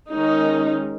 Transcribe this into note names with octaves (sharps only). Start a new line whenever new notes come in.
D#3 G#3 C#4 D#4